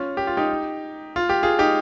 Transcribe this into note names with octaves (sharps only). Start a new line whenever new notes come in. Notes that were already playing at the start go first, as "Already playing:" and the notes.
Already playing: C#4 F4
G4
F4
D#4 G4
F4
G4
F4 G#4
D#4 G4